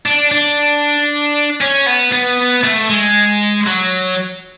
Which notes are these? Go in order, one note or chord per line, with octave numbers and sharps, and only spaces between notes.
D4
D4
C#4
B3
B3
A3
G#3
F#3